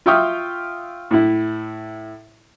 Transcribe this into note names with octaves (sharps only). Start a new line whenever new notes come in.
F4 E5 G5 C#6 D#6 F6
A2 E4